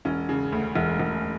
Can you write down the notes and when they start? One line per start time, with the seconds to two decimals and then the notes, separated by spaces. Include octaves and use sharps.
0.05 E1 C#4
0.29 C#3
0.52 D2
0.75 E1
0.99 E1